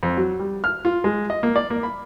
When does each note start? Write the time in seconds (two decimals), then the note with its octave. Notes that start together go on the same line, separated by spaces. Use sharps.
0.03 F2
0.17 F#3
0.39 G3
0.64 F6
0.85 F4
1.04 G#3
1.30 D#5
1.43 A#3
1.56 D5
1.70 A#3
1.83 B5